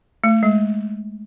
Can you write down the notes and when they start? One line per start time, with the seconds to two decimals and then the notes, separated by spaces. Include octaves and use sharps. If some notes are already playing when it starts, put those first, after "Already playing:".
0.24 A3
0.43 G#3